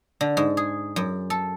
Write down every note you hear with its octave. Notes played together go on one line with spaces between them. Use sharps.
D3
G#2
G#4
F#2
A4